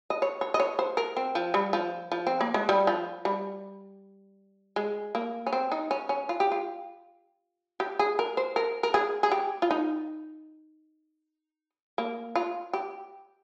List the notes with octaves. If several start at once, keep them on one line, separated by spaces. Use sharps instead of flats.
D#5
C#5
C#5
D#5
C#5
C5
A#4
C4
F3
G3
F3
F3
C4
A#3
G#3
G3
F3
G3
G#3
A#3
C#4
C4
D#4
C#4
C#4
F4
G4
F4
G4
G#4
A#4
C5
A#4
A#4
G#4
G#4
G4
F4
D#4
A#3
F4
G4